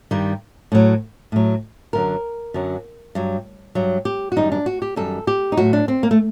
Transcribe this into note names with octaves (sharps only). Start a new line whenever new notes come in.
G2 D#3 G3
A2 F#3
A2 F#3
F#2 D3 F#3 A#4
F#2 D3 F#3
G2 F#3
G2 F#3
G4
F#4
F#2 D#3 G3 D#4
D4
F#4
G4
F#2 D#3 G3 A4
G4
D#4
A2 F#3 F#4
D4
C4
A#3
A3